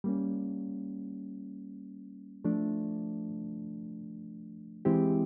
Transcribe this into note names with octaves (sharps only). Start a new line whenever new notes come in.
G3 A#3 C#4
F3 A3 D4
E3 G#3 C4 E4 G4